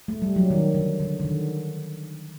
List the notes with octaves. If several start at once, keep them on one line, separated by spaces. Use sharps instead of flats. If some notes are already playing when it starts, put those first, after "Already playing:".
A3
G3
F#3
D#3
D3
D3
D3
D#3